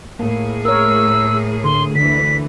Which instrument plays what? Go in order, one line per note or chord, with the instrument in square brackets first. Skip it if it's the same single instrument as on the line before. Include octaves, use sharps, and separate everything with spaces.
[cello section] A2 G#4 [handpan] A#3
[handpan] A#4 C#5 [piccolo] E6
[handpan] D3 [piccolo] C6
[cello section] D2 E3 [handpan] D3 [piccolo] B6